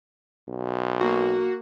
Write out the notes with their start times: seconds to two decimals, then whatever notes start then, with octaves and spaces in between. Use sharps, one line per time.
0.48 B1
1.01 A#3 F#4